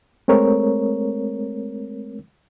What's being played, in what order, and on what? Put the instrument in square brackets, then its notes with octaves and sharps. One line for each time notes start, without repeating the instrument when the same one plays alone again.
[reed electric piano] G#3 A3 C4 A#4 C#5